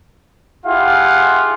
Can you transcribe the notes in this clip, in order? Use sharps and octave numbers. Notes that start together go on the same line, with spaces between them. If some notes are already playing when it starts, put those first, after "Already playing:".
E4 F4 G4 G#4 F5 F#5